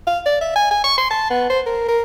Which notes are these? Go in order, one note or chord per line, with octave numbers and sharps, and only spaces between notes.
F5
D5
E5
G#5
G#5
C#6
C6
A5
B3
C5
A#4
A#4